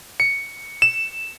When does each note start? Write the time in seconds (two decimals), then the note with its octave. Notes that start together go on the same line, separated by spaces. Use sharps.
0.20 C#7
0.82 E7